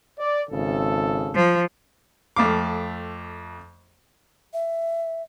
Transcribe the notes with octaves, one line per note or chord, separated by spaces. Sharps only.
D5
G#1 C#3 A4
F3
F2 A3 F5 D6
E5